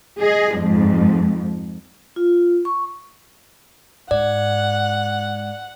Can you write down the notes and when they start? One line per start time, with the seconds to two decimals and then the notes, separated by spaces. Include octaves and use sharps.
0.20 G#4 D#5
0.56 F2 G#2
2.16 F4
2.65 C#6
4.11 G#2 D5 F#5